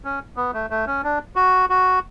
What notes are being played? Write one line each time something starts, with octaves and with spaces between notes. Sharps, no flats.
C#4
B3
A3
A3
C#4
D4
F#4
F#4